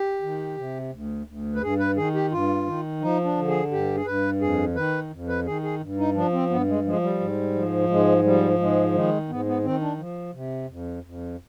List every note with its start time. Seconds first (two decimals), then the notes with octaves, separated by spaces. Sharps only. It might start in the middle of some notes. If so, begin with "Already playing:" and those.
Already playing: G4
0.22 D#3
0.57 C3
0.92 D2
1.27 D2
1.55 B4
1.62 G2 G#4
1.79 B4
1.96 D#3 G#4
2.14 G4
2.32 G2 F4
2.67 D#3
3.01 F3 D#4
3.24 D4
3.36 D3
3.48 G#4
3.71 G2 G4
3.95 G#4
4.06 G2 B4
4.40 F2 G#4
4.75 D#3 B4
5.11 F2
5.28 B4
5.45 D#3 G#4
5.63 G#4
5.80 G2
5.98 D#4
6.15 F3 D4
6.33 C4
6.50 G2 B3
6.68 G#3
6.84 F3 G#3
7.02 G3
7.20 G#2
7.54 F3
7.89 G#2 G#3
8.24 F3 G3
8.59 G#2 G#3
8.94 D#3 G#3
9.29 G#2 B3
9.46 B3
9.64 D#3 C4
9.81 D4
9.98 F3
10.34 C3
10.69 F2
11.04 F2